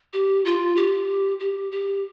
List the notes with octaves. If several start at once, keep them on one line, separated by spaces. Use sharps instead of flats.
G4
F4
G4
G4
G4